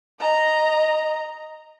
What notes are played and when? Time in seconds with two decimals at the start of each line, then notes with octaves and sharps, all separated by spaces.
0.20 D#5 A#5